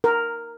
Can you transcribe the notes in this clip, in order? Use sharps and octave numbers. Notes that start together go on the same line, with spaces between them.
A#4